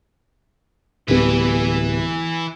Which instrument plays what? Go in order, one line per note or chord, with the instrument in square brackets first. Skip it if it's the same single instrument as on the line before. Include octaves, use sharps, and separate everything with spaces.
[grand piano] D1 G3 B3 [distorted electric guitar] E3 B4